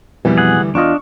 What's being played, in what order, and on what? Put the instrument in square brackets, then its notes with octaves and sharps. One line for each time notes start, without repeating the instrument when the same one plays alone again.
[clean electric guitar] F2 B2 [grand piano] E3 G3
[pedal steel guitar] G#4 F#5
[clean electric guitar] D2
[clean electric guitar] E2 F4 D#5 [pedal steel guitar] D4 [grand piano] C#6